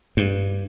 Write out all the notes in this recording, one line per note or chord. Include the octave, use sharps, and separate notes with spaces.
G2